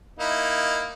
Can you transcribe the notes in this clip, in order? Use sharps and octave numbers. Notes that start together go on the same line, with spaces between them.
A#3 D#4 E4